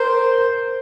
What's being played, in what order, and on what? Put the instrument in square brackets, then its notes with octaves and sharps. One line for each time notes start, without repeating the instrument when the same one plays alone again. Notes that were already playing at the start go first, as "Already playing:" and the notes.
Already playing: [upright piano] A#4 [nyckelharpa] C5